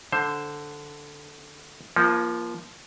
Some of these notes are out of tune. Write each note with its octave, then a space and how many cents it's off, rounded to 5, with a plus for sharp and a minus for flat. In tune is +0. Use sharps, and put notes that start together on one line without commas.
D3 +0 C5 +10
F3 -15 A#3 +20